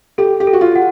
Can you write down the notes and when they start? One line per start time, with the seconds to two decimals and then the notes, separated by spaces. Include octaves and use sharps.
0.18 G4 A4
0.40 G4
0.47 A4
0.53 F#4
0.61 F4
0.76 F#5